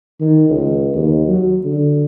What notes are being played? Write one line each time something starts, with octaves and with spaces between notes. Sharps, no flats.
D#3
C#2
D#2
F#3
D3